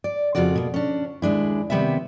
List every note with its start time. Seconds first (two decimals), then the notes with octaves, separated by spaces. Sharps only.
0.04 D5
0.35 F2 C#3 F4 F#4 D5
0.56 B2 A#3
0.74 C#4 D4
1.22 D#2 G#3 D4 E4
1.70 C3 D#3 G3 B3 B4 E5